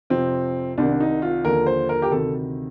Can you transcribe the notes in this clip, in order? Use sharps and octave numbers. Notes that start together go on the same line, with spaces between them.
F2 C3 F3 C4
C2 C3 D#3 D4
D#4
F4
D#2 D3 F3 A#4
C5
A#4
G4
D2 C3 D#3 A4